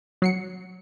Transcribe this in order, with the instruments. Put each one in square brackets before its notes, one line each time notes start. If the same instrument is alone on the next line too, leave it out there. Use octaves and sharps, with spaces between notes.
[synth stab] F#3 C7 C#7